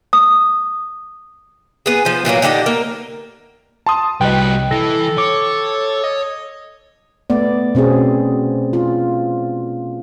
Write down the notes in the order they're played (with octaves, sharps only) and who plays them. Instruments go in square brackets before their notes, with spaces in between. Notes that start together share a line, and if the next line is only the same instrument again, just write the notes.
[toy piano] D#6
[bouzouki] B3 G#4
F3 C5
A#2 E3 F#3 A#3
D3 D#4 G4 F#5
A#3 A#4
[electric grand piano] A5 C6 D#6
[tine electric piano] C2 D#5 [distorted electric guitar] G3 F#4 [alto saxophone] B4 [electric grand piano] G5
[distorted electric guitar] E3 [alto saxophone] A4 [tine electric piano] A#6
[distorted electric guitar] C#5 [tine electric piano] D6
[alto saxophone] D#5
[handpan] A3 B3 D5
B2 C4 C#4 G#4
F4